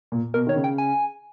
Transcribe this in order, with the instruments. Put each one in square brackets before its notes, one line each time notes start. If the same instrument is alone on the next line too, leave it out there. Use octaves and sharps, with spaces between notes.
[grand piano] A#2
[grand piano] B2 [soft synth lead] A#4
[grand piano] D#3 [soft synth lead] C#5
[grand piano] C#3
[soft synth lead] G5
G#5